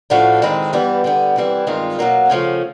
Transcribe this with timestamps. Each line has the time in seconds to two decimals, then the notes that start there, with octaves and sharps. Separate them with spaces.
0.10 A2 F3 A3 D4 F#4
0.42 D#3 G#3 C4 E4 A4
0.73 G2 E3 G3 B3
1.04 D3 G3 B3
1.36 E3 G3 C4 E4
1.67 G2 D#3 G#3 C4 F4
1.99 B2 F#3 A#3
2.30 C#3 F3 A3 C#4